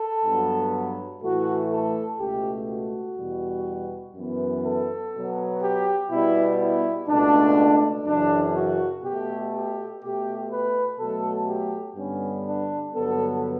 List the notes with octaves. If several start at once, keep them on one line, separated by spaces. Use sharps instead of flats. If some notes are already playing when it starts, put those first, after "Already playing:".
Already playing: A4
G2 F#3 B3
A2 E3 A3 F#4
A4
C#2 B2 A3 G4
F#4
E2 B2 G3
F#2 E3 B3
A4
B2 F#3 B3
G4
B2 G3 B3 E4
E4
C#2 B2 A3 D4
F#2 C#3 E3 D4
F#4
B2 G4
A3
G4
B2 A3 G4
B4
B2 F#3 A3 A4
G4
G2 D3 G3 B3 C#4
D4
G2 D3 F#3 B3 A4